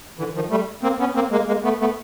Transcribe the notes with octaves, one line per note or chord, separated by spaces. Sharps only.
D3 E3
D#3 F3
G3 A3
A#3 C4
B3 C#4
A#3 C4
G#3 A#3
G#3 A#3
A3 B3
A3 B3